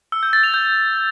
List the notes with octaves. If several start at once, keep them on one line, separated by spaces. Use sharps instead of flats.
E6
G6
A6
F7
G6